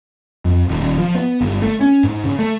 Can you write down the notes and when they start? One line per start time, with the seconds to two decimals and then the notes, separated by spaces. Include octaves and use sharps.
0.45 F2
0.68 D#1
0.81 D#1
0.98 F3
1.15 B3
1.41 G1
1.62 A3
1.81 C#4
2.04 G#2
2.24 C#3
2.39 A3